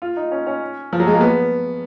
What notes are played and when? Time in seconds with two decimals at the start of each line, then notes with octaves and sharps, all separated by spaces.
0.02 F4
0.17 D#4
0.32 C#4
0.47 C#4
0.93 F3
1.00 F#3
1.07 G#3
1.14 A#3
1.21 B3